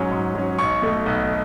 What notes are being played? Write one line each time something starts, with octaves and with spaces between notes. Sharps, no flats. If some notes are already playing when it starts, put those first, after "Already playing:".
Already playing: G#2 F#3 C#4
G#2
F#3 C#4
B1 C#6
B2 A3
B1